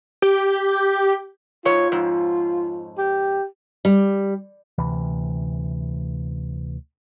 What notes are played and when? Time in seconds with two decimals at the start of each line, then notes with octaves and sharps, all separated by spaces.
0.22 G4
1.65 G#2 F4 C#5
1.92 F2 G#2
2.98 G4
3.85 G3
4.78 D2 C3 E3